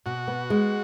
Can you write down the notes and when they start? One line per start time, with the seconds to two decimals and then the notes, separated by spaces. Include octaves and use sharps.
0.06 B2 F#4
0.28 B3
0.50 G#3